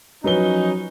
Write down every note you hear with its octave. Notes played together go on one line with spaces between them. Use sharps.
F3 F#3 C#4 D#4 B4 G7